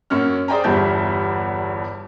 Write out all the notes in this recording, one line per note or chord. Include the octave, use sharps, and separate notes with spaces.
F#2 A#3 C#4 F6
G#4 C5 D5 G5 G#5 A#5
G1 E2 G2 E5 A5 G6